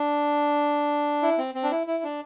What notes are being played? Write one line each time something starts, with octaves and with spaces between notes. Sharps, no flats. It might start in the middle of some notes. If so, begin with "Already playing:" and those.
Already playing: D4
E4
C4
C4
D4
E4
E4
D4